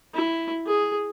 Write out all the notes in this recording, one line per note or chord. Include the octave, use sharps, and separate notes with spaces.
E4
G#4